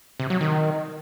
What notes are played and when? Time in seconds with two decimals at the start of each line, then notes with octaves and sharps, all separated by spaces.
0.20 C3
0.30 F#3
0.41 D#3